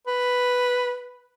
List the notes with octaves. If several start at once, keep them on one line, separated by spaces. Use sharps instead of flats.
B4